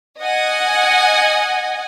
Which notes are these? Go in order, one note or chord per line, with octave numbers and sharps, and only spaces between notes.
D#5 F#5 G#5